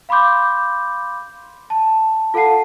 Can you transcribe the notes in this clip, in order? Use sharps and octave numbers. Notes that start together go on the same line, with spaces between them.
F5 B5 C6 D6 G6
A5
F4 A4 F5 F#5 A5 C7